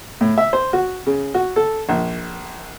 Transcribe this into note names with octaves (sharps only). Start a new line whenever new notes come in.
A2
E5
C5
F#4
C#3
F#4
A4
A#1